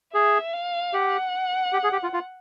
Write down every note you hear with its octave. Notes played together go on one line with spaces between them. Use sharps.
G#4 E5
F5
G4 F#5
G4
G#4
G4
F4
F4